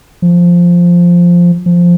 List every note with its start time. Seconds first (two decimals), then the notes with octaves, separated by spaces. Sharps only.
0.22 F3
1.66 F3